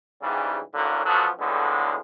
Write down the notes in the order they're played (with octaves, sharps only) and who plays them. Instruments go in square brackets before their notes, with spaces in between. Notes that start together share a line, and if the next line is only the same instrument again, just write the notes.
[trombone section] D2 G#2 C#3 E3 G3
B1 A2 D3 F#3 A#3
B2 F3 F#3 B3 C#4 A4
D2 A2 D3 F3 G#3 B3